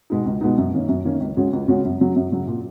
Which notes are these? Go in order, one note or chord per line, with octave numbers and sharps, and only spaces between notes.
B2 G#3 B3 D#4
C#2
B2 G#3 B3 D#4
F#2
D#3 A#3 C#4
F#2
D#3 A#3 C#4
C#2
C#3 G#3 C#4 F#4
C#2
C#3 G#3 C#4 F#4
F#2
C#3 F#3
F#2
C#3 F#3
A#2